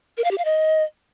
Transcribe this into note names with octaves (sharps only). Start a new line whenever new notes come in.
A#4
F5
G4
F5
D#5